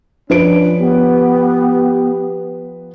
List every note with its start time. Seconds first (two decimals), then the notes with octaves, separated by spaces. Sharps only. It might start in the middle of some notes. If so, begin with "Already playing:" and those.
0.30 F3 C#4 D4 B4 D7
0.79 B3 G4